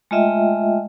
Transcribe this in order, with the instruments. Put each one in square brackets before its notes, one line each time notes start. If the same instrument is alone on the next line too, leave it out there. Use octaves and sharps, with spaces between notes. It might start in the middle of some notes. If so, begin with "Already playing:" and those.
[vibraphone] G#3 A3 F4 D#5 E5 G5